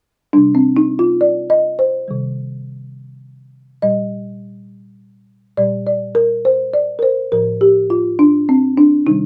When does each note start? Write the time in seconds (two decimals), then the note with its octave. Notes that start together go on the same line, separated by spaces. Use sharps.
0.33 C3 G3 D4
0.55 C4
0.77 D#4
0.99 F4
1.21 D5
1.50 D#5
1.79 C5
2.08 C3 D#3 G3
3.82 A#2 G3 D#5
5.57 A#2 G3 D5
5.87 D5
6.15 A#4
6.45 C5
6.74 D5
6.99 A#4
7.03 C5
7.32 A2 F3 A#4
7.61 G4
7.90 F4
8.19 D4
8.49 C4
8.78 D4
9.07 C3 D#3 G3 D#4